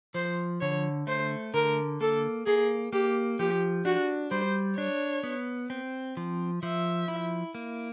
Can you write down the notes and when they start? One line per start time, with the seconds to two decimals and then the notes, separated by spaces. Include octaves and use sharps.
0.15 F3 C5
0.61 D3 C#5
1.07 A3 C5
1.54 D3 A#4
2.01 A#3 A4
2.46 A#3 G#4
2.93 A#3 G4
3.39 F3 G4
3.85 D4 F#4
4.31 G3 C5
4.77 D4 C#5
5.23 B3
5.70 C4
6.17 F3
6.63 F3 E5
7.08 E4
7.55 A#3